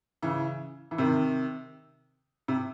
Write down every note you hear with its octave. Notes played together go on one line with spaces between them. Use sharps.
C#3 E3
E3
C3 D#3
C3